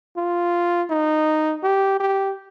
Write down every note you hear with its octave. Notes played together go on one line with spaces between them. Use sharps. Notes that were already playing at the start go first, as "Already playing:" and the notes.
F4
D#4
G4
G4